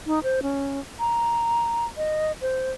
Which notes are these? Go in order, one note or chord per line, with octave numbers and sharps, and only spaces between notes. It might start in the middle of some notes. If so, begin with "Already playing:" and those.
D#4
C5
C#4
A#5
D#5
C5